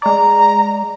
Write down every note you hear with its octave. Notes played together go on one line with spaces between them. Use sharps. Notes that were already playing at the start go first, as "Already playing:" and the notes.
G#3 D5 A#5